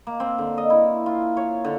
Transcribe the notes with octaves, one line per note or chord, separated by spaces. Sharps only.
A#3
C4
D3
D#5
E4
F4
C#5
D3